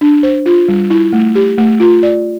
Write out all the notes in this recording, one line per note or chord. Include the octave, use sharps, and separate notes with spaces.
D4
C5
F4
G3
E4
A3
G4
A3
F4
D5